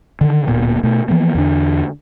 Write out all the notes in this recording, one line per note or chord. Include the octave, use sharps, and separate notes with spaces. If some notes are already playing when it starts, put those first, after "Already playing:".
D3 D#3
D1 A#2 A#3 B3
B2 A3
E3 F3 A#3 B3
E2 D3 D4